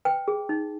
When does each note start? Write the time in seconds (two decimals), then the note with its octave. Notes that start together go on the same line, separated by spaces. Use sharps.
0.05 B4 G5
0.28 G#4
0.49 D#4